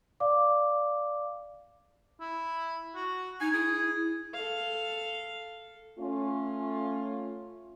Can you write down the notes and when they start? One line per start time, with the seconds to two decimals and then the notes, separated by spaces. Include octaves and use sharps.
0.20 D5 F5 D6
2.20 E4
2.95 F#4
3.41 D#4 G#5
3.53 E4 G#4
4.34 A4 F5
5.98 A3 C#4 F4